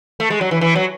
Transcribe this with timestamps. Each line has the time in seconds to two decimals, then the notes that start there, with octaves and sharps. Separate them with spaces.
0.20 A3
0.30 G#3
0.41 F#3
0.51 E3
0.61 E3
0.75 F#3